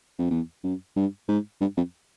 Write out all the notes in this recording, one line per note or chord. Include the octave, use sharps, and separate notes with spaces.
F2
E2
F#2
G2
G#2
G2
F2